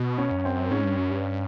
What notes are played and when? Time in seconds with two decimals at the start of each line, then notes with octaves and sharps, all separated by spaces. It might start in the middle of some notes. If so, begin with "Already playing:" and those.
Already playing: B2
0.18 C#4
0.31 F#2
0.45 C4
0.71 G#2 C#4
0.85 G2
0.97 F#2
1.11 G2